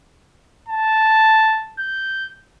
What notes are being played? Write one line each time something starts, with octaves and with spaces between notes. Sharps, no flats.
A5
G6